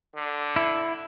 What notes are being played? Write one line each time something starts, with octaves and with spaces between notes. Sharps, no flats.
D3
E4